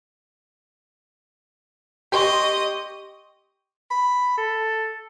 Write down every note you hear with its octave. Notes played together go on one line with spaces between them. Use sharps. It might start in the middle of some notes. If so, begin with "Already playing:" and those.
G4 D#5 C6 C#6 D#6
B5
A4